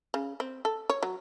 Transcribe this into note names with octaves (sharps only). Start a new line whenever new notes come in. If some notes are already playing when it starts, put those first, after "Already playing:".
C#3
C4
A4
C#5
F#3